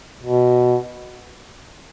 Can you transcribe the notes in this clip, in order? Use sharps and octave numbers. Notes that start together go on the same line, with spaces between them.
B2